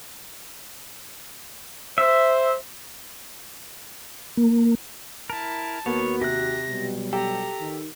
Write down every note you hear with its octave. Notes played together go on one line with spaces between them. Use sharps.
C5 E5
A#3
E4 A#4 A5
D#2 A#3 B3 F#4 C#5
C3 G4 F#6 A#6
B2 F#3 G3
G4 A4 A#5
D#3